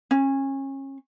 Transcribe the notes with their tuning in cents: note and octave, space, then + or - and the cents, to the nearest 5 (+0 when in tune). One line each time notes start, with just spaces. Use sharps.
C#4 -30